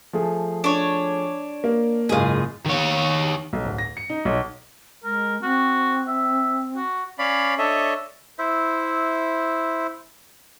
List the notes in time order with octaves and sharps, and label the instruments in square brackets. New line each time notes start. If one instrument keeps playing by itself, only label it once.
[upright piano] F3 A3 G#4
[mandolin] D4 C#5
[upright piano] A#3
[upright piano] F#1 G#2 [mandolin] F4 G#4
[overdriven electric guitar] D#3 C#5
[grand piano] B1
D1
A#6
C#7
D#4
B1
[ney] G#3 [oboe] A#4
[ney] C4 [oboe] F#4
[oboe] E5
F#4
[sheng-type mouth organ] C#4 C#5 D5 F5 B5
D4 A4 C#5 D#5 E5
[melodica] E4 C5 E5